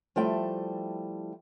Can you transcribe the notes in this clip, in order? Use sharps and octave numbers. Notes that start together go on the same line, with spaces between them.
F3 G3 A3 E4 G5